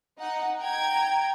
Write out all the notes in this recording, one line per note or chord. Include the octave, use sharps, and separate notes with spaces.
D#4 F#5
G5 A#5 G#6